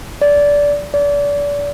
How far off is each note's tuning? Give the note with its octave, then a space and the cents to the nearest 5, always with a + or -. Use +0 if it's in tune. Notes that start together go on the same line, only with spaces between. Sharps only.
D5 -20
D5 -35